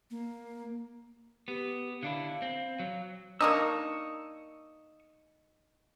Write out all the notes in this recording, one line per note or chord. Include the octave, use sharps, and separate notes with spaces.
A#3
B3 G4
D3 D4 E4 F5
C4
F#3
A#3 D4 D#4 C#6 D#6 E6